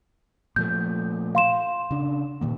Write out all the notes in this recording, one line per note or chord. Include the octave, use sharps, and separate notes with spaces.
A#2 F3 A3 G6
F5 C6 E7
C#3 D4
A#2 D#3 A#3